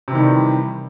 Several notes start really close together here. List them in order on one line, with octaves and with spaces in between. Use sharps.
C3 E3 D#3 G3